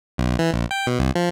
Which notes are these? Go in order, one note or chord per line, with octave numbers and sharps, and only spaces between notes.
B1
E3
A#1
G5
B2
C2
F3